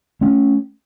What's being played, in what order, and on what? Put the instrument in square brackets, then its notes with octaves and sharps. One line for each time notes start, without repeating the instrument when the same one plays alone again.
[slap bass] A3 C#4